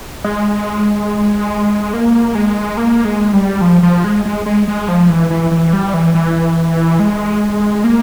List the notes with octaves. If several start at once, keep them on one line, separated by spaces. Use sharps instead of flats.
G#3
A#3
G#3
A#3
G#3
G3
F3
F3
G#3
G#3
G#3
G#3
F3
E3
E3
E3
G3
E3
E3
G#3
A#3